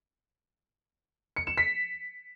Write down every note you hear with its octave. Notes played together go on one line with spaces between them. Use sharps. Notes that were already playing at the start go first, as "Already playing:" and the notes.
C#7
E7
B6